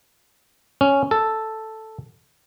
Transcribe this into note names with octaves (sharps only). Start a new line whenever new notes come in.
C#4
A4